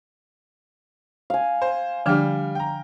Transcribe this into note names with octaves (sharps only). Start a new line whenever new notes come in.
F5 G#5
C5
D3 F3 G3 D4 G5 F6
G5 A#5